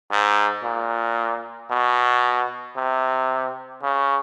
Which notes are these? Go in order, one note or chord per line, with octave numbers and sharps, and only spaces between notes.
G#2
A#2
B2
C3
C#3